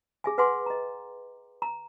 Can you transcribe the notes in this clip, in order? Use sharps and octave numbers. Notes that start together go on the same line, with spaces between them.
G#4 E5 G#5
B4 E5 F#5 G#5 C6 D6
D#5 A#5
A#5